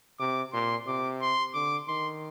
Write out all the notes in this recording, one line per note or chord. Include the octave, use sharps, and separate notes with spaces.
C3 D6
A#2 C6
C3 D6
C6
D3 D6
D#3 C6